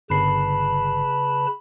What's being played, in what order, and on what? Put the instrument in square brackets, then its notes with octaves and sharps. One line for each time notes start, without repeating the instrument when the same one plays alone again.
[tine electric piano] G1 C7 [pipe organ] C#3 B4 A5 [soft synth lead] B5